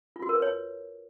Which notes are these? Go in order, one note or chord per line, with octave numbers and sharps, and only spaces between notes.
F4
F#4
A#4
B4
C#5